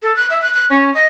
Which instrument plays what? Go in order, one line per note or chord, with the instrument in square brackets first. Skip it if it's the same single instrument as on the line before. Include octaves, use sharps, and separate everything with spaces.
[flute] A4
F#6
E5
F#6
F#6
C#4
D#5